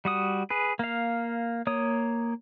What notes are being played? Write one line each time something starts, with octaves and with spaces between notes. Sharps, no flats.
G3 F#4 D#6
G#4 B4
A#3 F5
A#3 C#5 D#6